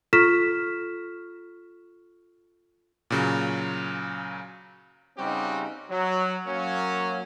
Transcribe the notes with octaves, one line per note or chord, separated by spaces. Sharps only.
F4 A4 C#6 F6 B6 E7
A#2 C#3 F#3
C#3 G3 C4 D#4 F#4 G4
F#3
F#3 A#3 C#4